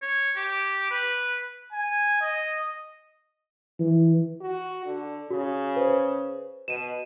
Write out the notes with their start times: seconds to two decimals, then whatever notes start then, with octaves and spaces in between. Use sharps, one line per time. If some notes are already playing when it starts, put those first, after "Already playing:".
0.02 C#5
0.36 G4
0.91 B4
1.72 G#5
2.21 D#5
3.80 E3
4.41 F#4
4.86 D3
5.30 C#3 F#4
5.76 B4 C5
6.68 B2 D#7 E7